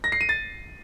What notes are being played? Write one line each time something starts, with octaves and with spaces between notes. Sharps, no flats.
A#6
C7
D#7
A6